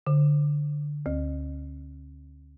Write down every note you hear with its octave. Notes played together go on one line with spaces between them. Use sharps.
D3
D2